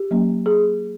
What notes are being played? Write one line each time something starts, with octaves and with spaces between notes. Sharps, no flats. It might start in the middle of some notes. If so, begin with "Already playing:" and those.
Already playing: G4
F#3 A#3 C#4
G#4